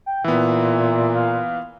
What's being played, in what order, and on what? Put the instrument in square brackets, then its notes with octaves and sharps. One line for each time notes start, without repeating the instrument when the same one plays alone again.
[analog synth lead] G5
[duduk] A#2 [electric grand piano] E3 B3 [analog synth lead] E5
[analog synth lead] F5